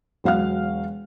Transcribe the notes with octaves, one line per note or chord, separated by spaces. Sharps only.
E1 F#3 F5 F#5 F6